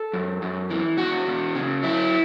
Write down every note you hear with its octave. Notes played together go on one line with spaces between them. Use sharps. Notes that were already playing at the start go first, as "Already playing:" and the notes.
Already playing: A4
F#2
F#2
E3
E2 F#4
E2
C#3
F#3 E4